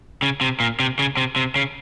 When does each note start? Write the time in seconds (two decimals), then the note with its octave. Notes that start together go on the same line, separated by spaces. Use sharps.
0.23 C#3
0.41 C3
0.60 A#2
0.80 C3
0.99 C#3
1.17 C3
1.36 C3
1.56 C#3